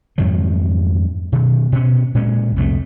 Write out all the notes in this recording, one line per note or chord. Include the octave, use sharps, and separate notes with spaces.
F2 G#2 D#3 F#3
B2 D#3
B2 C#4
A#2 G#3 C4 C#4
C2 F2 G3 A3